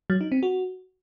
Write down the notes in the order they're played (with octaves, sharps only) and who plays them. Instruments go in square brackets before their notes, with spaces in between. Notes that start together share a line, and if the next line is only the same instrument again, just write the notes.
[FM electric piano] F#3
D#4
C4
F#4